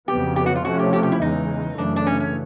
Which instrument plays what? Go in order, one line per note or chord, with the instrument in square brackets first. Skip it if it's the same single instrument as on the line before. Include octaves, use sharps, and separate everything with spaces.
[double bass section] F2 C#3 F#3 B3 [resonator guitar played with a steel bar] G4
[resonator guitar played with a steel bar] G4
F#4
F4
[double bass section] C3 F3 A3 C#4 [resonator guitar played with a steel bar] F#4
[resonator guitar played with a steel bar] G4
G4
G4
E4
[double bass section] E2 C#3 E3 G#3 [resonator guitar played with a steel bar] D#4
[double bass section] F#2 C#3 E3 A3 [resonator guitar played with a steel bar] D4
[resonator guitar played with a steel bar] D4
C#4
C#4